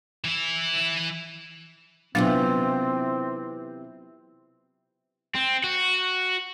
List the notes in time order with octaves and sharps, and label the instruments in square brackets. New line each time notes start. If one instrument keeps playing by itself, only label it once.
[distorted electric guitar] E3 E4
[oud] C3 E3 F4 [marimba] F#3 B3 D4 [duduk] C4
[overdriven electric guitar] C4
F#4